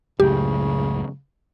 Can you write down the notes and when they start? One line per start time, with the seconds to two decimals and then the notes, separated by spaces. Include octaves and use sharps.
0.20 C#2 F#2 A2 C#3 G4